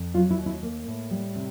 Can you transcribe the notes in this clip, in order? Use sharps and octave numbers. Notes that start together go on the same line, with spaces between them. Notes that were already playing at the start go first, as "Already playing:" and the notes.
Already playing: F2
F#3 F4
E4
D#2
E4
A#3
A2
G3
C3